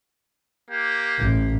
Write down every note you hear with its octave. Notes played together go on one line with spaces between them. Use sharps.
A#3 G4
A1